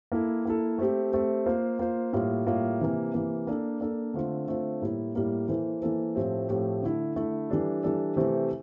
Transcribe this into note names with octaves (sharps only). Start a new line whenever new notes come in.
A#3 E4 A4
A#3 E4 A4
A3 C4 G4
A3 C4 G4
A#3 F4 C5
A#3 F4 C5
A2 G3 A#3 F4
A2 G3 A#3 F4
C3 E3 A#3
C3 E3 A#3
A#3 D4 A4
A#3 D4 A4
D3 A3 C4 F4 C5
D3 A3 C4 F4 C5
A2 G3 A#3 E4
A2 G3 A#3 E4
E3 A#3 E4 A4 C5
E3 A#3 E4 A4 C5
A2 F3 A3 C4 G4
A2 F3 A3 C4 G4
D3 A3 E4
D3 A3 E4
E3 G3 D4 A4
E3 G3 D4 A4
C3 E3 A3 C4 G4